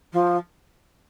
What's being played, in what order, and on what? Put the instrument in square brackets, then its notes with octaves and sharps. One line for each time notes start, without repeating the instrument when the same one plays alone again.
[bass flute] F3